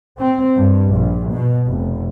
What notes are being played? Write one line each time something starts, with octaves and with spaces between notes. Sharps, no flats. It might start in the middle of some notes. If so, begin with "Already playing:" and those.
C4
G2
A#1
B2
F1